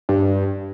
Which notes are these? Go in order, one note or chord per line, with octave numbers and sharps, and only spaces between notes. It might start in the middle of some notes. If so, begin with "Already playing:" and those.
G2